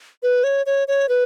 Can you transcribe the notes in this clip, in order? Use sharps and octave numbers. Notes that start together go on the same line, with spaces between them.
B4
C#5
C#5
C#5
B4